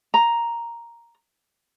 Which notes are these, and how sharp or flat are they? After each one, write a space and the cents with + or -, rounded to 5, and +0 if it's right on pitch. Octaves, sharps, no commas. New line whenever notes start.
A#5 +5